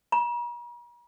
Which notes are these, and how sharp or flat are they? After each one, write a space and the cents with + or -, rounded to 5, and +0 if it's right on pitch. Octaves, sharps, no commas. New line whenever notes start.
A#5 +45